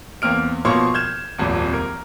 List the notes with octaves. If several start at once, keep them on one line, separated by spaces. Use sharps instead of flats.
E2 A#3 C4 F6 D7
B2 F3 A#3 C#5 C6 C#6
F6 G6 G#6 E7
D#1 G#1 F2
A#4